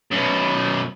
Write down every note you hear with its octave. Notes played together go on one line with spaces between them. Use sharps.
F#2 B2